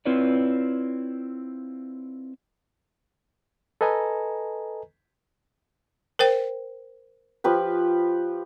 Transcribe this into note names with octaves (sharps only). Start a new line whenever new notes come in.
C4 E4 F4 B4 C#5 D5
A4 B4 D#5 G#5 A#5
A#4 C5 G5
F3 G4 B4